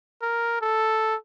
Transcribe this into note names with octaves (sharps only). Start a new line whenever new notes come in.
A#4
A4